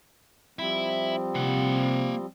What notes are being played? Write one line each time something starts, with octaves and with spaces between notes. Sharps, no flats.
F3 G3 C4 E4
C3 A#3 F#5